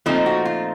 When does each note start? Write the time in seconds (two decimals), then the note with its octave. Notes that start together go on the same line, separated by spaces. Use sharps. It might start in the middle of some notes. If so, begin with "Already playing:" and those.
0.06 A#2 F3 A3 C4 D#4
0.26 F#4
0.45 F4